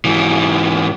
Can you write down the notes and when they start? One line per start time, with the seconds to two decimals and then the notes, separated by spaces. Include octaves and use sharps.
0.05 G#2 E3